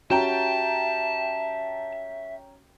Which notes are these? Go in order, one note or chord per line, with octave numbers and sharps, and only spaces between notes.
C#4 F#4 G4 E5 G5 A5 A#5